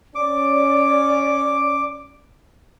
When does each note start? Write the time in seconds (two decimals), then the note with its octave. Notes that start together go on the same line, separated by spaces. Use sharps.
0.15 C#4 D5 D6